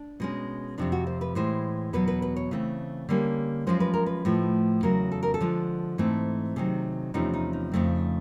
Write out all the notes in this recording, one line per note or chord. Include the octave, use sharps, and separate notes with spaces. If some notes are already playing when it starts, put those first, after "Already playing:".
Already playing: D4
B2 G#3 C#4
F2 C3 F3 D4
F#4
C5
B4
A2 E3 G#3 C5
E2 B2 F#3 B3 B4
B4
B4
C#5
C#3 E3 A3 C4
D3 G3 A#3 C#4
F#2 C#3 F3 G#3 C#4 C5
B4
A#4
B4
A2 F3 A3
E2 C#3 F#3 A#4
A4
A#4
A4
D3 F3 G#3
G#2 E3 A3 C4
C3 D#3 F#3 G#4
E2 C3 F3 A3 C#4 D#4
D#4
D#4
F2 C#3 F3 A3 C4